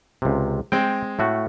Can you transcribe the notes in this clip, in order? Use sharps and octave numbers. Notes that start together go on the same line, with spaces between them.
C#2 C3
G#3 C4 G5
A2 A3 F#4